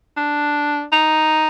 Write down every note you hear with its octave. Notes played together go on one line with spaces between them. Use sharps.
D4
D#4